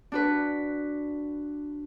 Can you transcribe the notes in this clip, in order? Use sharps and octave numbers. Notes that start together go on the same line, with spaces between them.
D4 F#4 B4